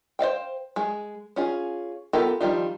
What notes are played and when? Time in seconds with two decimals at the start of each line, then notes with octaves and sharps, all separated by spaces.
0.19 C5 D5 F5 G5
0.76 G#3 G#4
1.36 C#4 F4 G#4
2.13 B3 F4 G4 A4 A#4
2.41 D#3 F3 G3 D4 F4